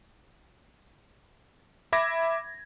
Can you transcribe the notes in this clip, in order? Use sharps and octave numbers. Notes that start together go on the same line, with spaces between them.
E5 B5 D6 G#6 A#6